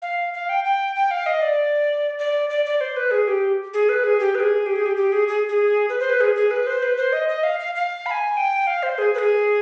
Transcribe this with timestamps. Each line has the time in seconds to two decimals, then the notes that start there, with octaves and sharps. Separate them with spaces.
0.02 F5
0.34 F5
0.49 G5
0.65 G5
0.96 G5
1.11 F5
1.26 D#5
1.42 D5
2.19 D5
2.50 D5
2.66 D5
2.81 C5
2.96 B4
3.11 G#4
3.27 G4
3.74 G#4
3.89 B4
4.04 G#4
4.20 G4
4.35 B4
4.40 G#4
4.66 G4
4.76 G#4
4.86 G4
4.97 G4
5.12 G#4
5.28 G#4
5.49 G#4
5.89 B4
6.00 C5
6.10 B4
6.21 G#4
6.35 G#4
6.51 B4
6.67 C5
6.82 B4
6.97 C5
7.13 D#5
7.29 D#5
7.44 F5
7.59 F5
7.75 F5
8.06 B5
8.11 G#5
8.37 G5
8.67 F5
8.83 C5
8.98 G#4
9.14 B4
9.19 G#4